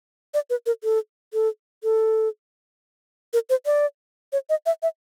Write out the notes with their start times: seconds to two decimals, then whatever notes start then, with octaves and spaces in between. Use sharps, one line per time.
0.34 D5
0.50 B4
0.66 A#4
0.84 A4
1.33 A4
1.83 A4
3.33 A#4
3.50 C5
3.66 D5
4.32 C#5
4.50 D#5
4.66 E5
4.83 E5